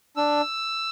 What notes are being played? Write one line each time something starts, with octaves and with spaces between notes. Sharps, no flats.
D4 E6